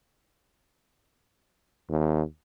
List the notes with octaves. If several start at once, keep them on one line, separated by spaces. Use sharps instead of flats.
D#2